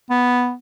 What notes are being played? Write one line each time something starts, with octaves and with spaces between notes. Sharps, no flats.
B3